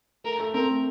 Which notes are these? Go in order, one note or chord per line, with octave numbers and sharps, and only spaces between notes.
A3 A#4
A3
C4 A#4
A3